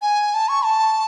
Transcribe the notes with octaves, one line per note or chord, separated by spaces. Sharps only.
G#5
A5
C#6
A5